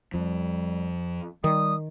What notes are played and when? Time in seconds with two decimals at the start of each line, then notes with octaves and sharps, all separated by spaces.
0.14 F2 F3 G3
1.44 D#3 G3 D#6